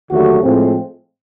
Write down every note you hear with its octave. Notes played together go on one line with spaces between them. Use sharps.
D#2 D3 F#3 A3 F#4
A2 F3 G#3 C4